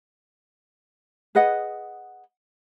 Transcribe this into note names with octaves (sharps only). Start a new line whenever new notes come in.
G#4 B4 D#5 F#5